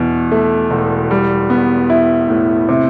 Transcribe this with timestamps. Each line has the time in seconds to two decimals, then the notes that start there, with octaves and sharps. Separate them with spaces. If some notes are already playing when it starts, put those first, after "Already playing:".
Already playing: E2 B2
0.32 A3
0.71 E1
1.11 G3
1.50 B3
1.90 E4
2.29 A2
2.69 C3